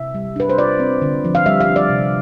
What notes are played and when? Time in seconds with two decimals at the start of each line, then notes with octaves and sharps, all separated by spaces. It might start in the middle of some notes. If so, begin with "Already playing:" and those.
Already playing: C3 E5
0.15 G3
0.36 D4 B4
0.49 C5
0.58 F4 D5
0.80 C4
1.02 D3
1.25 F3
1.35 F5
1.46 G3 E5
1.61 F5
1.68 D4
1.76 D5
1.90 C3